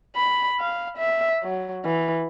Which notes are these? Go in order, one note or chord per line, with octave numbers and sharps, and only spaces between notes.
B5
F5
E5
F#3
E3